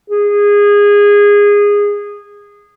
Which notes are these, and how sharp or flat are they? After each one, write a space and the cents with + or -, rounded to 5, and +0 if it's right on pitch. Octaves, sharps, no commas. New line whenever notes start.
G#4 -20